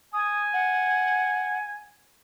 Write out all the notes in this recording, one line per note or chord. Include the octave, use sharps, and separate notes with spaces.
G#5 D#6
F#5